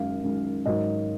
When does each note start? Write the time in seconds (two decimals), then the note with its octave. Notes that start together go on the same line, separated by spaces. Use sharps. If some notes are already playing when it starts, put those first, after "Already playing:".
Already playing: F#2 D#3 G#3 F5
0.23 F#2 D#3 G#3
0.66 G#2 D#3 F#3 D#5